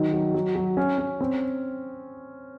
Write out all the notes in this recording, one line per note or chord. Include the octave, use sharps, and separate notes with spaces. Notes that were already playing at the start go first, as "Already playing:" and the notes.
Already playing: D#3 F#3
F#3
F#3
F#3
C#4
C#4
C4